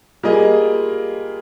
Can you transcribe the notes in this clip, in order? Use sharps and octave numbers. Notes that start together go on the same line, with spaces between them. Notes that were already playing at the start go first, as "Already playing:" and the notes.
G3 A#3 F4 G#4 D#5